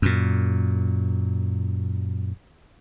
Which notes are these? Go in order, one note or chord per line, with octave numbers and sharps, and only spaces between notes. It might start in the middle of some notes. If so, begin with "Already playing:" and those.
F#2 A#2